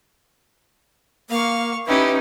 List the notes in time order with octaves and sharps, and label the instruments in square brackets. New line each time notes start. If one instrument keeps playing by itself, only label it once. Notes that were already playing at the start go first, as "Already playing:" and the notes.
[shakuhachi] A#3 [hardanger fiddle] F5 C#6
[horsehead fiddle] C#4 D#4 [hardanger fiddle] E4 G4 [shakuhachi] B4